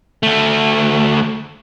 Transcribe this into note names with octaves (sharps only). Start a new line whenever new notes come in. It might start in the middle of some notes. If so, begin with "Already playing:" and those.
D2 A3